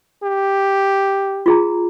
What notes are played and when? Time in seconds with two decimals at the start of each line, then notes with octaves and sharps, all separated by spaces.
0.23 G4
1.46 F4 G#4 A#5